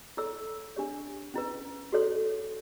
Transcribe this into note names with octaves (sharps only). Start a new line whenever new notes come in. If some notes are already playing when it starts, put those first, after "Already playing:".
E4 A4 C#5 E6
D4 G4 C#5
C#4 E4 B4
F#4 A4 C#5